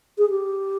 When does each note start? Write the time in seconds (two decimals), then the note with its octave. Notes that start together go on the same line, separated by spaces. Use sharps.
0.18 G#4
0.30 G4